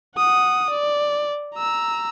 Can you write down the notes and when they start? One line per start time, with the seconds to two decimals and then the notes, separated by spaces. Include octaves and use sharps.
0.17 F#5 D#6
0.70 D5
1.55 A#5 E6